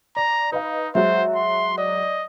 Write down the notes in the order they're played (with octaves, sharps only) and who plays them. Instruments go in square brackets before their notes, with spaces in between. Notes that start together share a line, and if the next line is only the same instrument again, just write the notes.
[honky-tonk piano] D5 [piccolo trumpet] A#5
[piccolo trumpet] D#4 [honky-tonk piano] B4 D#5 F5
[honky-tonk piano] F#3 G#3 F#4 [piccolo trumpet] C5 [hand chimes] E5
[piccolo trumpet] C6
[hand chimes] D5 [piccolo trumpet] D#5